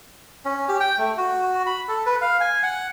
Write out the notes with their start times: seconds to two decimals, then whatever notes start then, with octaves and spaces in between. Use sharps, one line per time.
0.45 C#4
0.69 G4
0.80 G5
0.98 A3
1.17 F#4
1.66 B5
1.88 A4
2.06 B4
2.22 F5
2.40 G#5
2.63 F#5